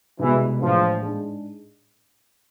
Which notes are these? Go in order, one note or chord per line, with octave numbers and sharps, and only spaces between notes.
C2 B2 E3 G#3 B3
A2 E3 F3 G#3 D4
G#2 G#3 D4 G#4